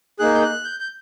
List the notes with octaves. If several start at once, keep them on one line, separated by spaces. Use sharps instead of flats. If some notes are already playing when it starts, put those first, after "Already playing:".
A#3 D#4 G#4 F#6
G6
F#6
G6
G6